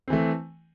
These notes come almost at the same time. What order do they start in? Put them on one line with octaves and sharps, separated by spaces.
C4 E3 A3